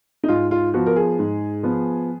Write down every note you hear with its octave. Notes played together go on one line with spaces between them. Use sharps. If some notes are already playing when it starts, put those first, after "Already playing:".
D#4
G#2 F4
F4
F3 B3 F#4
A#4
G#4
G#2
F3 B3